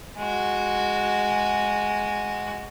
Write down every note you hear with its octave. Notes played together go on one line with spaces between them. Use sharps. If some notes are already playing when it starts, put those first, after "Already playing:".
G#3 F#4